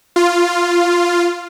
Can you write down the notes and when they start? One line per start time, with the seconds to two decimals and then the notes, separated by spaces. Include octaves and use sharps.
0.16 F4